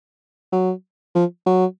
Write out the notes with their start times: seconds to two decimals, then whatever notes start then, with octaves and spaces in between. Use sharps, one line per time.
0.52 F#3
1.15 F3
1.46 F#3